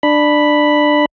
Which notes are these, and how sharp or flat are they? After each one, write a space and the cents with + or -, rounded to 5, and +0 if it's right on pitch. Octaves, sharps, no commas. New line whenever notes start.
D4 +15 B5 +0